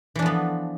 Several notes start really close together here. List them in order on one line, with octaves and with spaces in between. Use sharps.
E3 D4 F3 B3